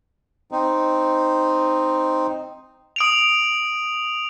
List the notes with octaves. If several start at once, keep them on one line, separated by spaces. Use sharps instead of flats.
C4 D#4
D#6 D7 F7